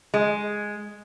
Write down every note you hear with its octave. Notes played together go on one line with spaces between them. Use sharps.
G#3